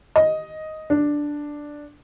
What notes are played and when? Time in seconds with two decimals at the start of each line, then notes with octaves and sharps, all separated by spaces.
0.16 D#5
0.90 D4